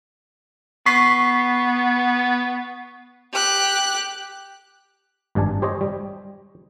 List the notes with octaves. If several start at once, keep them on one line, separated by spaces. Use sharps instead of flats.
B3 C#6 B6 C7
G4 F#6
G#1 G2 D5 G#5 A5
G4 C5 C#5 D#5
G3